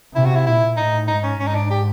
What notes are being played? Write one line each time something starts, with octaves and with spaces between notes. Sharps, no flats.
C3 E4
F#4
E4
A#2 E4
A2 D#4
G#2 D#4
C#4
G#2 C#4
D#4
D4
G4